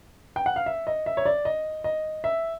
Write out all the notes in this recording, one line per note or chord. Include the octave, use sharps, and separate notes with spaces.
G5
F#5
F5
E5
D#5
E5
C#5
D5
D#5
D#5
E5